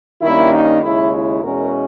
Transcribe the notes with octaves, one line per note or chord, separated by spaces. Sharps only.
G2 D#3 A#3 C#4 E4
D#4
D#2 C#3 G#3 E4
E4
E2 B2 G#3 C#4 A#4